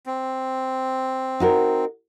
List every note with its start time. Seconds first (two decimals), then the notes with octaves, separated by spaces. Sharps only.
0.06 C4
1.40 D#4 F#4 A#4